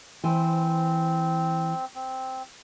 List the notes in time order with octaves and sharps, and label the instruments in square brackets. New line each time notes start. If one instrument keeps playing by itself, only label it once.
[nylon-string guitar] E3 C5 [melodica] C4
[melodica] C4